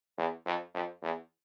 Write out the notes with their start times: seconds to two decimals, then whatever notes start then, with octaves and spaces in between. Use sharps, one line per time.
0.18 E2
0.46 F2
0.74 F2
1.03 E2